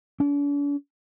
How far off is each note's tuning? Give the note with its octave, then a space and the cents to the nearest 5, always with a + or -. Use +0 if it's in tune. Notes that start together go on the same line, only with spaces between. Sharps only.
D4 -45